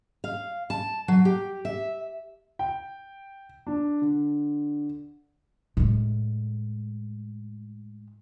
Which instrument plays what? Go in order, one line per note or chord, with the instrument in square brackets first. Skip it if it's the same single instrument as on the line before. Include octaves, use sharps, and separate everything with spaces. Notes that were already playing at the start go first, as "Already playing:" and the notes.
[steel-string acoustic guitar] F5
A5
F#3
G4
E5
[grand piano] G5
D4
D3
[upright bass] A2 G#3